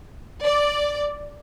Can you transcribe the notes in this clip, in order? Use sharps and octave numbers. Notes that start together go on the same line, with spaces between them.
D5